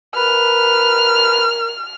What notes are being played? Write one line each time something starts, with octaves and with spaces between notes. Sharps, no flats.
A#4 B4 F6